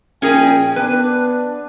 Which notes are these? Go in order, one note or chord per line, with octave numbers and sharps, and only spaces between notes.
A#1 C#4 G#4 A#4 G5
B3 D4 B4